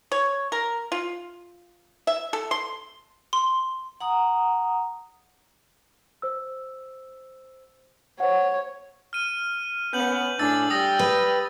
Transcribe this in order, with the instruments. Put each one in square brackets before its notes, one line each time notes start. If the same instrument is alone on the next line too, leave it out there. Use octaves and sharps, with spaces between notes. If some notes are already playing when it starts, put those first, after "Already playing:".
[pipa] C#5
A#4
F4
E5
A4
C6
[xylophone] C6
[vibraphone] F#5 A#5 D#6
[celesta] C5 E6
[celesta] C5 F#5 [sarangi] C#5
[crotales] F6 D#7
[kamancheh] B3 [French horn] C#4 [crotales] G6 F#7
[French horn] A2 [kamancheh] D4 G#4 [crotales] E6 A6 F#7
[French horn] G3 [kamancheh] G5 [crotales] D#6 E6 A#6
[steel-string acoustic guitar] B4